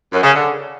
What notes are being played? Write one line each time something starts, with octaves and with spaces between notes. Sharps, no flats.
F#2
C#3
D3